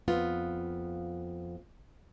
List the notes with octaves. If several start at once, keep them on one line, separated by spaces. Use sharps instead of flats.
F2 B3 F4